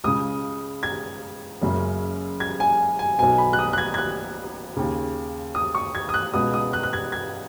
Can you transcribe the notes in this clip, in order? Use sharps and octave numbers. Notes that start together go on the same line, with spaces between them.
C#2 C#3 D#6
G#6
F#1 F#2 C#3
G#6
G#5
G#5
B1 B2 G#5
B5
F#6
D#6
F#6
G#6
G#6
F#6
D#2 C#3
D#6
C#6
G#6
D#6
F#6
C#2 B2 D#6
D#6
F#6
F#6
G#6
G#6